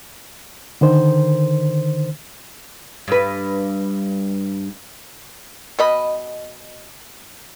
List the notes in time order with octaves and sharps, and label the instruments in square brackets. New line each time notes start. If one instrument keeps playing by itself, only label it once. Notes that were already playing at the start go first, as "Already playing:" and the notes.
[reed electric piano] D3 D#3 C5
[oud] G2 B4
[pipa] B2 D#5 B5